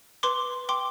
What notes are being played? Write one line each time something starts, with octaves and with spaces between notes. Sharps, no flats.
B4 C6 D6
G5 C6 D6